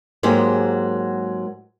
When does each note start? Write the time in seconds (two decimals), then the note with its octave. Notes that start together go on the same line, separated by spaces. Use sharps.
0.23 G#2 F#3 G#3 A#3 G4